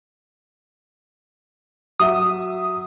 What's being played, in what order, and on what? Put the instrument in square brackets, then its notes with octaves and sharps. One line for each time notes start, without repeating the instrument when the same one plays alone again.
[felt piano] F#3 E5 [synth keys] D#6